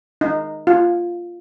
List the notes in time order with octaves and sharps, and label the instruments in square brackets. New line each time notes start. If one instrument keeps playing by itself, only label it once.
[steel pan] D#4
F4